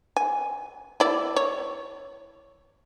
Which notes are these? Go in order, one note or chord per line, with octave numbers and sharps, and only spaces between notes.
G#5
E4 D5
C#5